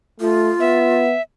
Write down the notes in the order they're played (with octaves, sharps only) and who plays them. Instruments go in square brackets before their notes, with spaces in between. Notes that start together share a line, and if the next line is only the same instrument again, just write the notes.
[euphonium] A3 [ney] F4
[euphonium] B3 [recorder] E5